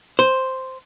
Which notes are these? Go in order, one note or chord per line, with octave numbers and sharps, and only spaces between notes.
C5